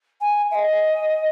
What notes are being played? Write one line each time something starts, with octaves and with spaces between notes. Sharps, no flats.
G#5
E5
D#5